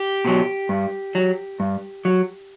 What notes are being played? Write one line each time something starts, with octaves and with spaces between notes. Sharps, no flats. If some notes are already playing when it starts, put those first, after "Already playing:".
Already playing: G4
B2 F#3
G2
F#3
G2
F#3